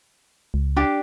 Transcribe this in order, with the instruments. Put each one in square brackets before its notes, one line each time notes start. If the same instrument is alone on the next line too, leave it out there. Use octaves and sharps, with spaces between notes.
[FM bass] C#2
[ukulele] D4 G4